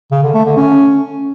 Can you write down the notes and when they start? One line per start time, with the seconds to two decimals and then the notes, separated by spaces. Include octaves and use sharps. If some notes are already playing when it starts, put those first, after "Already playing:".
0.12 C#3
0.23 D3
0.34 A3
0.46 D3
0.57 C#4